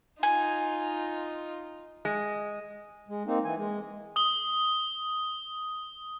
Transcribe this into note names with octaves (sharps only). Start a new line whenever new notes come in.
D#4 F4 G#5
G#3
G#3
A#3 C4 D#4
E3 G#5
G#3
D#6 G7